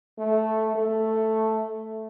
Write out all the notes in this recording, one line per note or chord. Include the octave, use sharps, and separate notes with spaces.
A3
A3